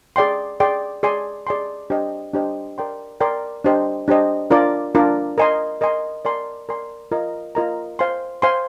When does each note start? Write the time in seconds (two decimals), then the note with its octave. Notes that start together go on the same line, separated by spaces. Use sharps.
0.16 G#4 D5 G5 C6
0.60 G#4 D5 G5 C6
1.03 G#4 D5 G#5 C6
1.47 G#4 D5 G#5 C6
1.90 D4 G4 C5 D#5
2.33 D4 G4 C5 D#5
2.78 A#4 D5 G5 C6
3.20 A#4 D5 G5 C6
3.64 D4 G4 C5 D#5
4.08 D4 G4 C5 D#5
4.51 D4 F4 A#4 D5
4.95 D4 F4 A#4 D5
5.38 A#4 D#5 G#5 C6
5.81 A#4 D#5 G#5 C6
6.25 A#4 D5 G#5 C6
6.69 A#4 D5 G#5 C6
7.11 F4 A#4 D#5 A#5
7.55 F4 A#4 D#5 A#5
7.99 C5 F5 G#5 C6
8.42 C5 F5 G#5 C6